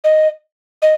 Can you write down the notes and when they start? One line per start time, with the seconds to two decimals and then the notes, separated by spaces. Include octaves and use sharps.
0.04 D#5
0.82 D#5